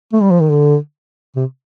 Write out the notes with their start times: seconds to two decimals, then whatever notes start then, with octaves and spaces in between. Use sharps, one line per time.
0.13 A3
0.22 G3
0.31 F3
0.41 D#3
0.51 D3
1.36 C3